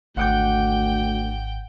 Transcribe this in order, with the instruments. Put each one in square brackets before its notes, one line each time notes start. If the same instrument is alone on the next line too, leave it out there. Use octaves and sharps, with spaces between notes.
[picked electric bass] G#1 [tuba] D2 [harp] F#5 D6 G6 [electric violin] G5